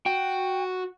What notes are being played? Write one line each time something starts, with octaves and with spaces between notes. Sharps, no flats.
F#4 G5